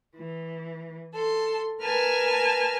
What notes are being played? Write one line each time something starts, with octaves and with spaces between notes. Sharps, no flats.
E3
A4 C6
A#4 B4 G#5 A5 F6